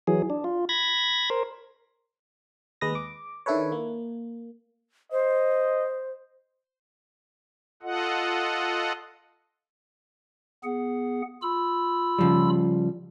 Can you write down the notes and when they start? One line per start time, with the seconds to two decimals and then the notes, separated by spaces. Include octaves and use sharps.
0.07 E3 F#3 G#4
0.30 D4
0.44 F4
0.69 B5 G#6 A#6
1.30 A#4 C5
2.81 D#2 G#3 B4 D#6 A#6
2.95 D6
3.46 D#3 D4 E4 A4 B4 C#5
3.72 A#3
5.12 C5 D#5
7.83 F4 A4 D#5 F#5
10.64 B3 G#4 F#5
11.42 F4 B5 E6
12.19 C#3 F3 G3